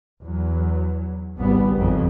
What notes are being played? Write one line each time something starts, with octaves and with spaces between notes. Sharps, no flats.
E2 F#3
G#1 C#2 G#2 G3 B3
G#1 F2 C#3